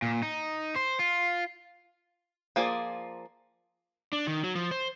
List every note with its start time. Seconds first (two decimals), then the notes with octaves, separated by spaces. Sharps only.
0.02 A#2
0.23 D#4
0.76 C5
0.99 F4
2.56 F3 A#3 F4 G#4 D5
4.13 D4
4.27 D#3
4.44 F#3
4.55 F3
4.71 C5